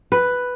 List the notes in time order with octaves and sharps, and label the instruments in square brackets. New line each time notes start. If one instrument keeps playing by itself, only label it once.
[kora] B4